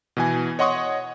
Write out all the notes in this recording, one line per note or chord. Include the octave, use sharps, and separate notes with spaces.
B2 E3 G#5
C#5 D#5 F#5 C6 C#6 D#6